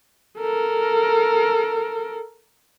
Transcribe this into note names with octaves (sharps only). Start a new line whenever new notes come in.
A4 A#4